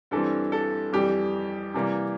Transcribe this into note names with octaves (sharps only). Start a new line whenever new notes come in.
G2 E3 G3 C4 A4
A4
F2 E3 G3 G4
C3 E3 G3 A#3